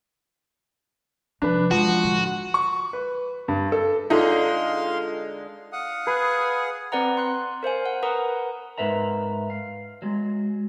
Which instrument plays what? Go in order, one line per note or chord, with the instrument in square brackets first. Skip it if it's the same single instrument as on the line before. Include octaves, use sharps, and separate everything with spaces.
[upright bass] C3 F3 [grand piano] D4 B4
[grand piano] F3 [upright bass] G#3 C4 [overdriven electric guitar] F#4
[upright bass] A2 D3
[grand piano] C#6
B4
G2
A4
[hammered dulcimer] D3 G#3 G#4 [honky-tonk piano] D#4 [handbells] F4 A4 [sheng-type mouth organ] F5 C6
[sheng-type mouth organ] F5 F#5 D#6
[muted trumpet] G#4 [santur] B4
[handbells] C4 B4 D5 F#5 A#5
C6 F#6
A#4 C5 F5 G#5
F#5
A#4 B4 F#5 A#5 D#6
[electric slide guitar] G#2 A#4 B4 E5 A#5
F5
F#3 G#3